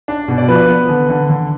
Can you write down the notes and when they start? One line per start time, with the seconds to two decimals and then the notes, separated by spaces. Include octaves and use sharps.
0.08 D4
0.28 B2
0.38 D5
0.48 F3 B4
0.69 B3
0.89 D3
1.10 D3
1.30 D3